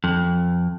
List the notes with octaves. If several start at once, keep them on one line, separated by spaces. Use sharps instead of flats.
F2